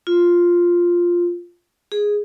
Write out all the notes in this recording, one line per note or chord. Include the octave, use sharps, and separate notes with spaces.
F4
G#4